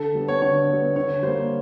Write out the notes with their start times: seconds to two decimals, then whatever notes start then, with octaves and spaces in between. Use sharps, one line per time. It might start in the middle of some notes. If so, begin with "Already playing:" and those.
Already playing: D3 A4
0.15 G3 B3
0.28 C#5
0.42 D3 C#5
0.69 G3 B3
0.96 D3 C#5
1.23 G3 A#3 C5